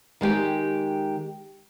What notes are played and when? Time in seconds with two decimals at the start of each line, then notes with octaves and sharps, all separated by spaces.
0.21 D#3 G#3 G4 G5